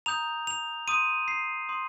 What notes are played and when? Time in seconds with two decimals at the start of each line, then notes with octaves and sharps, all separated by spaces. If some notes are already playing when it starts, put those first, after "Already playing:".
0.06 A#5 D#6 G6 F7
0.47 F7
0.88 C6 D#6 G6 D#7
1.28 C7
1.69 C6 D#6 G6